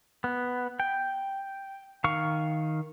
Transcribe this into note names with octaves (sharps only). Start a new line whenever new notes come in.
B3
G5
D#3 F5 C#6